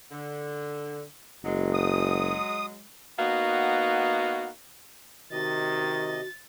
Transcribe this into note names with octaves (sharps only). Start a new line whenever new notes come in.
D3
F#1 F#3 G#3
D#6
A#3 B3 D#4 F#4
C3 D#3 F#4 D#5 A6